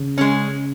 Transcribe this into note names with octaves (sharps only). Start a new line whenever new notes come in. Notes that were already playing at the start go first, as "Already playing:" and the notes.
Already playing: C#3
G#3 C#4